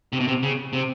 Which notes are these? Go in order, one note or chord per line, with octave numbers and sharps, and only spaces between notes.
C3
B2
C3
C#3
C3